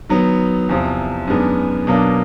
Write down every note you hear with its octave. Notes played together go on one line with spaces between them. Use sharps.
D#3 F#3 B3
E2 C3 F3
F#2 D#3 G#3 B3 D4
B2 F#3 A#3 D4